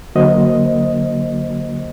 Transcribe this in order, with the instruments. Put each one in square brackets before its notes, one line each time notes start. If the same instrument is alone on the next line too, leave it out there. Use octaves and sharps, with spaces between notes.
[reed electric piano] D3 F#3 A#3 F#4 C5 D#5